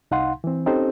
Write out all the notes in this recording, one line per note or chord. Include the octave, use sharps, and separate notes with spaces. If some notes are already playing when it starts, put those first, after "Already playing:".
C2 D#4 F5 F#5 C6
E3 C4
C4 C#4 D#4 G4 A4 C5